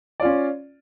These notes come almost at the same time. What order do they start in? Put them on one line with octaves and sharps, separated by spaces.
D5 F4 C#4